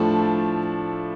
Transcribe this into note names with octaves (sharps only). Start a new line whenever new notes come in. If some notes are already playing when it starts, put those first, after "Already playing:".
Already playing: A2 F3 A3 D4 A5